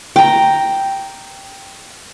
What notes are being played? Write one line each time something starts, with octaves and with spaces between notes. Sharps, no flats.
G5 A#5